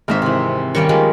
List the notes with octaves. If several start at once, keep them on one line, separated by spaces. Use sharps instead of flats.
G#1 G#2 A#4 C5 E5
C3 E3
D#3 G3 A#3 C#4 G5 C#6
F3 G#3 D#4 G4